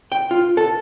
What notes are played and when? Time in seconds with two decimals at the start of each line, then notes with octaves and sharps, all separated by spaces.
0.12 G5
0.31 F4
0.57 A4